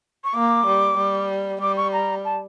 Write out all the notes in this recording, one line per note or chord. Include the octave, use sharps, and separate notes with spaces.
C#6
A#3 D6
G3
G3
G3 D6
C#6
A#5
A5